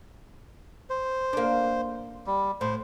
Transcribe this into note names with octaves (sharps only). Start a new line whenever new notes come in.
C5
A#3 D4
G3
A2 C5